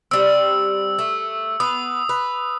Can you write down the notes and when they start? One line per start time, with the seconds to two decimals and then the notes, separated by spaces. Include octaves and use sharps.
0.11 G3 C4 E6
0.99 A3
1.60 B3 D#6
2.09 B4